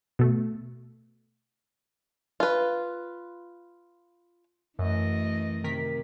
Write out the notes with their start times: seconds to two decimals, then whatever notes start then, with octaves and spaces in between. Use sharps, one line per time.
0.19 B2 A3
2.40 F4 B4
4.79 F#2 E3 A3 D#5
5.64 C3 D#3 A#4 B6